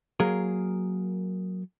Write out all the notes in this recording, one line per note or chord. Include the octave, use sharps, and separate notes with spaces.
F#3 A#3 G#4 A#4